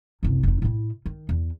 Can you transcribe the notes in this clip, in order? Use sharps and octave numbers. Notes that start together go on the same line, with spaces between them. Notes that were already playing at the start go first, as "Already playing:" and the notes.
F#1 C2
F1 D#4
A2 E4
D#3
E2